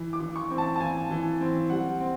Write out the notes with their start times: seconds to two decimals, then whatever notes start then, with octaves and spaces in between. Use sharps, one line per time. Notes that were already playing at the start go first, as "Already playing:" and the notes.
Already playing: E3
0.13 D6
0.20 E3
0.36 C#6
0.50 C4
0.58 A5
0.76 A5
0.80 E3 G#5
1.11 E3
1.41 C4
1.70 G3 F#5
2.00 C4